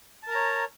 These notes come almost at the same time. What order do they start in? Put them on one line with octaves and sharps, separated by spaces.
A5 A#4 A#5 C#5